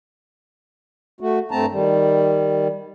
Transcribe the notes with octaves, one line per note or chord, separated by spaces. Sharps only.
A3 F#4
G2 A3 C4 A5 A#5
D#3 G3